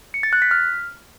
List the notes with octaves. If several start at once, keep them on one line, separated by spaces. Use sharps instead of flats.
C#7
A6
F#6
B6
F6